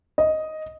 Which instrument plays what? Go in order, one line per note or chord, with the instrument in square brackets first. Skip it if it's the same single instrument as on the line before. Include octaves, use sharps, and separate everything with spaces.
[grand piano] D#5